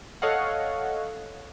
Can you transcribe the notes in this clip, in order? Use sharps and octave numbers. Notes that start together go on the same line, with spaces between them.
A4 C#5 D#5 F5 F#5